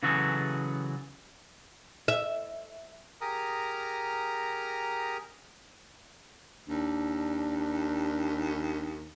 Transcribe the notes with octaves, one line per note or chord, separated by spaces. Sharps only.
C#3 E3 F#3 F#4 G#4 A4
E5
G4 G#4 A#4 A#5 D#6 F6
D#2 D4